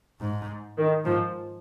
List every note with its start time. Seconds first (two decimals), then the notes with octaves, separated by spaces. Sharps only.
0.20 G#2
0.77 D#3
1.05 G#2 F3